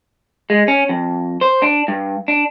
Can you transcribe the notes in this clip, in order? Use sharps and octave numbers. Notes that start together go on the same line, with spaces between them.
G#3
C#4
F2
C5
D4
G2
D4